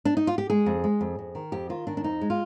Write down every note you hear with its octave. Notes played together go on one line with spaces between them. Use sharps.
D4
D#4
F4
G4
G#3 G#4
F2
G#3
F2
F2
D#3
F2 G4
D#3 F4
D#3 D4
D4
F2 D#4
G#3
F4